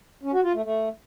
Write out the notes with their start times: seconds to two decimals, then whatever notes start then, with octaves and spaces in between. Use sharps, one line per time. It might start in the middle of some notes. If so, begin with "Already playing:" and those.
0.23 C#4
0.34 F#4
0.44 F4
0.54 A3
0.64 A3